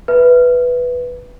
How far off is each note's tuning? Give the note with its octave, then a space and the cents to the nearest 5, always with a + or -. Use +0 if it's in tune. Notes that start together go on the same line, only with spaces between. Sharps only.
B4 +0 E5 +0